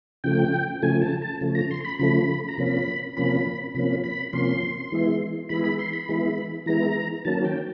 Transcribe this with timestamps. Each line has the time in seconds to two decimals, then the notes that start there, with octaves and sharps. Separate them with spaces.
0.24 C#3 F3 A3 G5
0.82 C#3 F3 A3 G#5
1.02 A5
1.22 A5
1.41 C#3 F3 A3
1.55 A#5
1.71 C6
1.85 B5
1.99 C#3 F3 A3 B5
2.48 A#5
2.58 C3 F3 A#3 C#4 B5
3.17 C3 F3 A#3 C#4 B5
3.75 C3 F3 A#3 C#4 B5
4.04 B5
4.33 C3 F3 A#3 C#4 C6
4.92 E3 G#3 B3 E4
5.49 E3 G#3 B3 E4 B5
5.64 B5
5.79 C6
5.93 B5
6.09 E3 G#3 B3 E4
6.66 E3 G#3 B3 E4 A#5
7.25 D#3 F#3 A#3 C#4 A5
7.45 G5